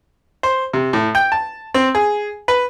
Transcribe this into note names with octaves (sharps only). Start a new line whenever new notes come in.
C5
C3
A2
G5
A5
C4
G#4
B4